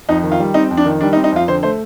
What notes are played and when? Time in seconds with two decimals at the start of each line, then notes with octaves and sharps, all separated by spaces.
0.09 F2 D#4
0.23 D#3
0.32 F4
0.40 G3
0.54 C4 D#4
0.71 F2
0.77 D4
0.86 D#3
1.01 G3 D4
1.13 D#4
1.17 C4
1.24 D#4
1.32 F2 F4
1.48 D3 C5
1.63 A3 C5